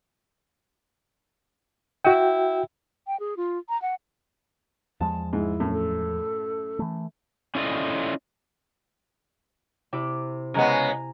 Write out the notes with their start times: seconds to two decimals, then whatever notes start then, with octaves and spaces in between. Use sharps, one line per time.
2.05 E4 F#4 G5
3.07 G5
3.20 G#4
3.37 F4
3.69 A#5
3.82 F#5
5.01 E2 F3 G#3 A5
5.33 G#2 E4
5.60 F#2 A2
5.73 A4
6.79 E3 A3
7.55 C#4 E4 F4 A4 D5 D#5
9.93 C3 E4 D6
10.54 C#3 G#3 B3 G#5 A#5